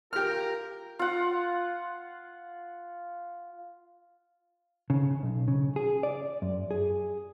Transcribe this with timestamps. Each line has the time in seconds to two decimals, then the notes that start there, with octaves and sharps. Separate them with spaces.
0.13 F4 G4 A#4 F6
0.99 F4 F#5
4.90 C#3
5.23 B1
5.48 C#3
5.76 G#4
6.03 D5
6.42 F#2
6.71 G#4